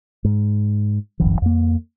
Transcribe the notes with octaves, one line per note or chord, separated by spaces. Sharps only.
G#2
D1 G1 F#2 E3
F2 A#3